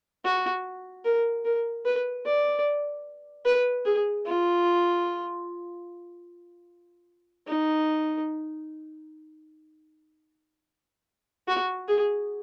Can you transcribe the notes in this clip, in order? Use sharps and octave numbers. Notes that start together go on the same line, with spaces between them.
F#4
A#4
A#4
B4
D5
B4
G#4
F4
D#4
F#4
G#4